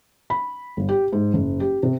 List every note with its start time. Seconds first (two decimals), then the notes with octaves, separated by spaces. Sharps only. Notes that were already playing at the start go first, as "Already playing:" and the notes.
0.30 B5
0.77 G1
0.89 G4
1.13 G#2
1.34 F#1
1.60 G4
1.83 C3